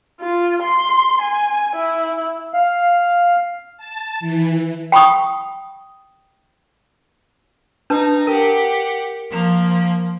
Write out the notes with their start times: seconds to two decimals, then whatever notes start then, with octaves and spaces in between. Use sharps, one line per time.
0.20 F4
0.63 C6
1.22 G#5
1.76 E4
2.54 F5
3.77 A5
4.20 E3
4.92 G5 B5 C#6 D#6
7.90 D4 D#4 B4 A5
8.27 G4 A#4 F#5
9.30 F3 A#3